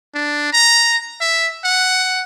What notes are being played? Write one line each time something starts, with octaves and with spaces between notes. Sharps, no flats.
D4
A#5
E5
F#5